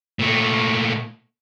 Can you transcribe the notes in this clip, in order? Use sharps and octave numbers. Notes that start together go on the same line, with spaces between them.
A#2 A3